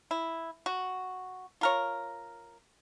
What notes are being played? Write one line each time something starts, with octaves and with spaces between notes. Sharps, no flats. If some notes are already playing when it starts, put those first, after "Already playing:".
E4
F#4
F4 A#4 C#5